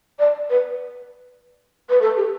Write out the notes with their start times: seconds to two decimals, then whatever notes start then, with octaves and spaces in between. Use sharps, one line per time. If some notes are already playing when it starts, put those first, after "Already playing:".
0.19 D5
0.50 B4
1.90 B4
2.01 A4
2.17 G4